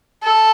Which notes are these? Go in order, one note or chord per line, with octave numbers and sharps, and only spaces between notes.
A4